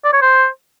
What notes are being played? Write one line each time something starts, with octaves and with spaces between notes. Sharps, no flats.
D5
C#5
C5